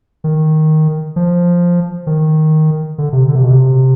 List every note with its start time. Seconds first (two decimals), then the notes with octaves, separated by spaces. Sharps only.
0.24 D#3
1.16 F3
2.07 D#3
2.98 D3
3.13 C3
3.28 D3
3.35 C3
3.43 B2
3.50 C3